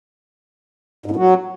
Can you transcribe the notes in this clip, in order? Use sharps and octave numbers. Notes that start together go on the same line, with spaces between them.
G#2
A2
F#3